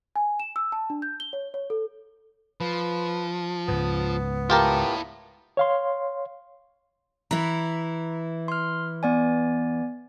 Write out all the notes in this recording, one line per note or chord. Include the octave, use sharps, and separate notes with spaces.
G#5
E7
E6
A5
D4
G6
G7
C#5
C#5
A4
F3 B4
C#2 G#2 B3
E4 F4 G4 A#4 A5
C#5 F5 C6
E3 E4 A#5
C6 F6
B3 D5 G#5